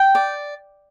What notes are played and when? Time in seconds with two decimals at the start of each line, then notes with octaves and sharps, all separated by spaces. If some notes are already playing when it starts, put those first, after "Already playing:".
Already playing: G5
0.15 D5